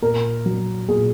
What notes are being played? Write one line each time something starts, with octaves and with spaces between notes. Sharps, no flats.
A#2 A#4
F#3
A#2 G#4